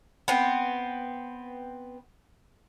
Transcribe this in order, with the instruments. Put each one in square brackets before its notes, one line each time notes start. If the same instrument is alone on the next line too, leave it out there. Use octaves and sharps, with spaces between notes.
[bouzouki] B3 C4